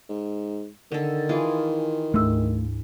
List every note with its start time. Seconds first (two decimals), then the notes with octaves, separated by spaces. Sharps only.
0.09 G#2
0.92 D3 D#3 A4
1.29 E3 F4 G#4
2.14 D2 G#2 A3 E6